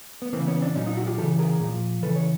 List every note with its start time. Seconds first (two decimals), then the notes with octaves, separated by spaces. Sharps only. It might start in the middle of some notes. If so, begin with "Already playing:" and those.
0.22 B3
0.33 E3 A#3 C4
0.36 C#3
0.47 B3 C#4
0.62 C4 D4
0.75 A#2 F#3 C#4 D#4
0.86 D#4 F4
0.97 E4 F#4
1.07 F4 G4
1.18 E3 G4 A4
1.21 C#3
1.39 G#4 A#4
1.60 A#2 F3
2.03 C#3 E3 A4 B4
2.16 C#5